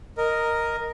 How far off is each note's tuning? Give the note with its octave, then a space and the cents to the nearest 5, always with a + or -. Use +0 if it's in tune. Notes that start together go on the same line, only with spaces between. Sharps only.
A#4 +0 D#5 +0